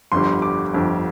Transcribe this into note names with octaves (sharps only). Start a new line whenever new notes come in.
G1 F2 D3 G3 C6
D6
G1 F2 D3 G3